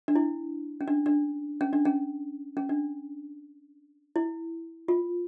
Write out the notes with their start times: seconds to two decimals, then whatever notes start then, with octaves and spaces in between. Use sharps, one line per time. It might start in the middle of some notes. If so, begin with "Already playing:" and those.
0.08 D4
0.15 E4
0.81 C#4
0.88 D4
1.06 D4
1.61 C#4
1.73 D4
1.85 C#4
2.57 C#4
2.69 D4
4.16 E4
4.88 F4